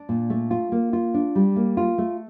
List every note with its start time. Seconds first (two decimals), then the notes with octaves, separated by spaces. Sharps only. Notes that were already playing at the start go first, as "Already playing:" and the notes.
Already playing: D4
0.09 A#2
0.30 A3
0.51 F4
0.72 A#3
0.93 F4
1.14 D4
1.35 G3
1.56 A#3
1.77 F4
1.98 A3